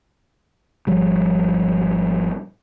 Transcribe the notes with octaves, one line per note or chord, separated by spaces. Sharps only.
G#1 F3 G3